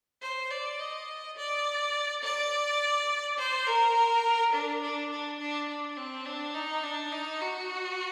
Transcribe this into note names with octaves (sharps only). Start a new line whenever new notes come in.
C5
D5
D#5
D5
D5
C5
A#4
D4
D4
D4
D4
D4
C4
D4
D#4
D4
D#4
F#4